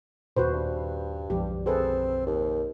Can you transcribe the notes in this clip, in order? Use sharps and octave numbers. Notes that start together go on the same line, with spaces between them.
D#2 A#2 F#4 B4 C5
G2
B1 F#2 F3 G4
C4 G#4 A4 B4
D#2